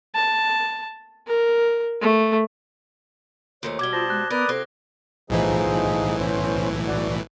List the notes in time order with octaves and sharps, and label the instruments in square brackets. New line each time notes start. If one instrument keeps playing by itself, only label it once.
[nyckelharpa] A5
A#4
A3
[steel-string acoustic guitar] D#2 F3 A3 [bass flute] C#5
[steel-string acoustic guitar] B2 G3 [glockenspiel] D6 G#6 G7
[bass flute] F4 [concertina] C5 A5 [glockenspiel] D#6 A#6
[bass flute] G#3 [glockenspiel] F#6
[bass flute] B3 [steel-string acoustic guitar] A#4 [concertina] B4 D5 D#6
[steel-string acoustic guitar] C3 C4 F4 [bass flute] A4
[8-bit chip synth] B1 A2 E3 [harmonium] F3 D#4 G#4
[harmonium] B3 C#4 C5
F#4 D5 F#5